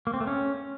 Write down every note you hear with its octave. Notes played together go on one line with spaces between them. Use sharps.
A#3
C4
A3
C#4